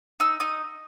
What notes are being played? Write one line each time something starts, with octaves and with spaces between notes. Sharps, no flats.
D#4 E6
D#4 D#6